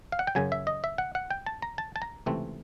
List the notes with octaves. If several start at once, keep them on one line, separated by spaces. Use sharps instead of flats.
F5
F#5
G5
F#2 C#3 F#3 G#5
E5
D#5
E5
F#5
F#5
G5
A5
A#5
A5
A5
A#5
C#2 C3 E3 A3 C4